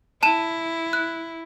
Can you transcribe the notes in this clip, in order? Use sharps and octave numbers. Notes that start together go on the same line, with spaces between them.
E4 A5 E7
F#6